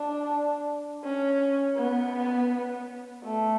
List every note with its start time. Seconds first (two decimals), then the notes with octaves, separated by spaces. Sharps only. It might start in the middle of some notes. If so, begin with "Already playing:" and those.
Already playing: D4
1.04 C#4
1.77 B3
3.25 A3